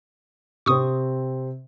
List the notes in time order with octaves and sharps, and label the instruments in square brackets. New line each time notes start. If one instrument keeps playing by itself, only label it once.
[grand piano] C3 C4 [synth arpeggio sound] C#6 D#6